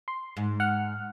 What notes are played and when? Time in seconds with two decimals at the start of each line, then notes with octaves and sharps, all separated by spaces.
0.08 C6
0.37 G#2
0.60 F#5 F6